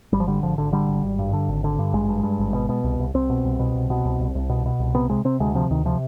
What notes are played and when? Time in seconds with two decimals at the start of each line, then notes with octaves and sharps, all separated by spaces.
0.13 G#1 G3
0.20 F3
0.27 D3 G3
0.43 G#1 F3
0.58 G#1 D3
0.72 D3 G3
0.88 G#1
1.03 G#1
1.19 G2
1.33 D3
1.48 G#1
1.64 D3
1.79 G2
1.93 G#1 G#3
2.09 G2
2.23 G2
2.39 G#1
2.54 B2
2.69 B2
2.84 C2
2.99 C2
3.14 C2 C4
3.30 B2
3.45 C2
3.59 B2
3.75 C2
3.90 B2
4.05 C2
4.20 C2
4.35 C2
4.49 B2
4.66 B2
4.79 C2
4.95 C3 B3
5.10 C3 G#3
5.25 C3 C4
5.40 D2 G#3
5.55 C3 F3
5.70 D2 D#3
5.85 C3 F3